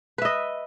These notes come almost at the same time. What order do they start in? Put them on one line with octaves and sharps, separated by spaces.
B4 E5 D#5